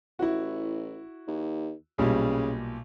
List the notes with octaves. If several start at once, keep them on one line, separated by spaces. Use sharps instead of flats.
A1 E4 F#4
D#2
B1 A#2 C#3 G3